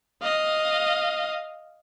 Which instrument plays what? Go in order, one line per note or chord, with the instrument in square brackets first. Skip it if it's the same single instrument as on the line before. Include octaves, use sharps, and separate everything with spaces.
[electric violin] D#5 F5